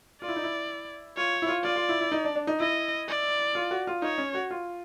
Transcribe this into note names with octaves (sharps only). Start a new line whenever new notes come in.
F4 D5
E4
D#4
E4
F4 C#5
E4
F4
F4 D5
F4
E4
E4
D#4
D4
D4
D#4
E4 D#5
D5
F4
F#4
F4
D#4 C#5
C#4
F#4
F4